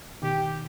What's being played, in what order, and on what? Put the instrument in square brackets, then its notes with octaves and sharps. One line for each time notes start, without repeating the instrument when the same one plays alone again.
[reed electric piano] B2 D#3 [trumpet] G4